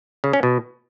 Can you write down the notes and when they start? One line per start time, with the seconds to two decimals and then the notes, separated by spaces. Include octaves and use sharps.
0.24 C#3
0.33 C#4
0.43 B2